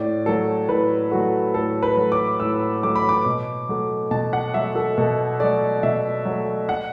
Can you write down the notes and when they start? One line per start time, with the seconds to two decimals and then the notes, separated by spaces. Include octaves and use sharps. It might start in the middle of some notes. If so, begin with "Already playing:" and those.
Already playing: A2 D5
0.26 F#3 A3 A4
0.69 A2 B4
1.11 F#3 A3 F#4
1.54 A2 A4
1.83 B4
1.97 F#3 A3
2.12 D6
2.40 A2 E6
2.83 F#3 A3 D6
2.95 B5
3.09 D6
3.26 B2
3.69 F#3 A3
4.11 B2 A5
4.33 F#5
4.54 F#3 A3 E5
4.75 A4
4.98 B2 A4
5.40 F#3 A3 D5
5.83 B2 E5
6.25 F#3 A3
6.69 F#5